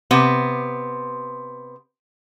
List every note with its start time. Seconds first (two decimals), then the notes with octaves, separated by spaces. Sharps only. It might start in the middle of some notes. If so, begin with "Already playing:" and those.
0.11 C3 B3